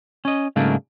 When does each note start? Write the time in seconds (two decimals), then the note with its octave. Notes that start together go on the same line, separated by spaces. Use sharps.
0.25 C#4 D#5
0.56 G#2 C#3 F#3 A3 A#3 D4